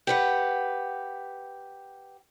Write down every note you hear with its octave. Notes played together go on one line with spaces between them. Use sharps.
G4 B4 F#5